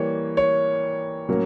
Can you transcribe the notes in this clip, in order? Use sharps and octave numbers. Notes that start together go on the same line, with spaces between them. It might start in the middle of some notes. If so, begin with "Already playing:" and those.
Already playing: E3 G3 A#3 C#5
C#5
A2 F#3 A#3 C#4